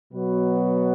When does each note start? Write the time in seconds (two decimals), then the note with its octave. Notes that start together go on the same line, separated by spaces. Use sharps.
0.13 B2 F#3 B3 F#4 B4